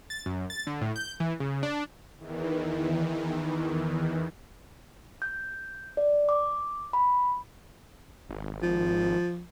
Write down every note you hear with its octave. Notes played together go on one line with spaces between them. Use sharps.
A6
F#2
A6
D3
A2
G6
E3
C#3
D4
E2 D#3 E3
G6
D5
D6
B5
G#1
F3